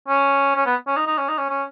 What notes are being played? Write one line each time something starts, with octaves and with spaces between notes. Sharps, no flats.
C#4
C#4
B3
C#4
D#4
D#4
C#4
D#4
C#4
C#4